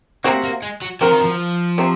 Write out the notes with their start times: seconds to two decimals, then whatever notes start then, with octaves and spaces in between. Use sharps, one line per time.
0.24 C3 F3 A#3 C4 F#4
0.43 A#3
0.62 G#3
0.82 F#3
1.01 F3 F#3 C4 F#4 A#4
1.12 D#3
1.23 F3
1.78 C3 F#3 C4